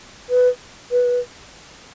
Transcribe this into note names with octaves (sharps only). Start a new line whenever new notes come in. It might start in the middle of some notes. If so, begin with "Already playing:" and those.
B4
B4